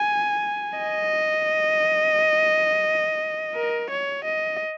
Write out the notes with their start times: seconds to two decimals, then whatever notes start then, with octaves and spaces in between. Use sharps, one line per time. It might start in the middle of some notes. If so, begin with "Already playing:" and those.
Already playing: G#5
0.79 D#5
3.55 A#4
3.90 C#5
4.24 D#5